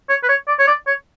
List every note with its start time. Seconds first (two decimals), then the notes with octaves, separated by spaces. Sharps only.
0.09 C#5
0.23 B4
0.29 C#5
0.48 D5
0.59 C#5
0.67 D5
0.87 C#5